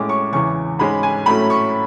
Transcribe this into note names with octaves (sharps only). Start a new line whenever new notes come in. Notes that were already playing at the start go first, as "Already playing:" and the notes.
Already playing: A2 G#3 C#4 D6
C#6
E2 C#3 E3 C#6
G#2 G#3 C#4 B5
G#5
A2 F#3 A3 C#4 B5
C#6